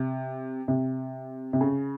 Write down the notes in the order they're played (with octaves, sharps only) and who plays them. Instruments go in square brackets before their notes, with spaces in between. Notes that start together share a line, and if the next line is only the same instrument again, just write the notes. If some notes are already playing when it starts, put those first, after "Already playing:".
Already playing: [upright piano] C3
C3
C3
C#3